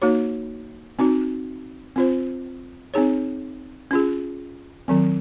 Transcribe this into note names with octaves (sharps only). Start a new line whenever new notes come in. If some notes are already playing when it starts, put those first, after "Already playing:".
A#3 D#4 F#4 C#5
C4 D#4 F#4
C4 F4 C5
C4 D#4 G#4 C#5
C#4 F4 G#4
D#3 F#3 C4